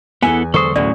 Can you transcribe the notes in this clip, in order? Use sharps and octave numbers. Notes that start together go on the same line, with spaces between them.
E2 B3 E4 A4 G#5
D3 F#3 G#3 A4 C5 C#6 D#6
F#1 D2 A2 E3 F#3 C#4 D5